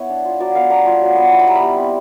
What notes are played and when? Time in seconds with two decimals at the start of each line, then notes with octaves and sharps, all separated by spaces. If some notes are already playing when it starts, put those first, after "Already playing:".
Already playing: B3 E4 B4 C#5
0.09 D4
0.25 F4
0.40 F#3 D5
0.55 B3 F5
0.70 D4 A#5
0.86 F4
1.01 F#3
1.16 B3
1.32 E4
1.39 B5
1.47 G3 A#5
1.55 B5
1.62 G3
1.77 C4